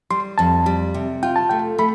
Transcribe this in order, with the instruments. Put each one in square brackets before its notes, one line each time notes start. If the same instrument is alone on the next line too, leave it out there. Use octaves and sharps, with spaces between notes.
[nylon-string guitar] G3 [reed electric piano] C6
[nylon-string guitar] F2 [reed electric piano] A5
[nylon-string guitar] G3
C3
[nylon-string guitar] F4 [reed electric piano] G5
[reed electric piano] A5
[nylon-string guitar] A3 [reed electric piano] G5
[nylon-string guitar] A3 [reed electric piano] B5